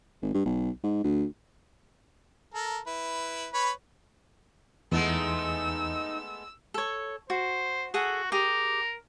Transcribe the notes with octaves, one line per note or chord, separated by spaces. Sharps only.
G#1
G2
B1
G#2
D2
A4 A#4
E4 B4
B4 C#5 B5
E2 G#3 A3 B3 D#4 E6
A4 C#5
F#4 C5
F#4 G#4 A4 F#5
G4 G#4 A#4